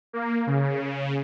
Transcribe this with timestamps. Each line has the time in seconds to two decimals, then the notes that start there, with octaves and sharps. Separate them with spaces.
0.13 A#3
0.47 C#3